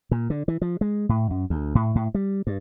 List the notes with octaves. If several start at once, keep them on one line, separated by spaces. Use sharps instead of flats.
A#2
D3
E3
F3
G#3
A2
F#2
D2
A2
A2
G3
G2